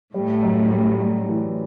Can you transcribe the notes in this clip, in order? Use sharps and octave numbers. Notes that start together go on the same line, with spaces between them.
A2 G3
F#2
G3
G3
E3